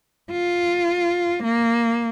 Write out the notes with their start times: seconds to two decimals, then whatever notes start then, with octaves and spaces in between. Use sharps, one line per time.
0.31 F4
1.44 A#3